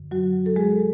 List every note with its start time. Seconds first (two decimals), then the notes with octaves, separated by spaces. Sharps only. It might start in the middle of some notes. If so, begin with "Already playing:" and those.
Already playing: F#2 D3
0.11 F#3 F#4
0.46 A4
0.56 G#3 G#4